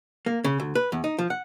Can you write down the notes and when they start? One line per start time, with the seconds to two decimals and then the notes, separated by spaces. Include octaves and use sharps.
0.26 A#3
0.44 C#3
0.60 D2
0.75 B4
0.92 E2
1.04 D#4
1.19 F3
1.30 F#5